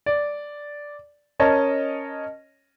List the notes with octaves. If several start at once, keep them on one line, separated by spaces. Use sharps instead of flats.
D5
C#4 A#4 C#5 D#5 A5